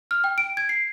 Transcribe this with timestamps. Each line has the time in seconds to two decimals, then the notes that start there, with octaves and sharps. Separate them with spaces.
0.11 F6
0.24 G5
0.38 D7
0.57 G#6
0.69 C7